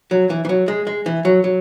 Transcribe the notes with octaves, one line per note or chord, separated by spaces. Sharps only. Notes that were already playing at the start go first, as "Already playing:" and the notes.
F#3
E3
E3
F#3
G#3
G#3
E3
F#3
F#3